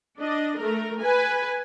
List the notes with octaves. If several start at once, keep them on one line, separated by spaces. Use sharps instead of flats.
D4 D#5
A3 A#4
B4 G#5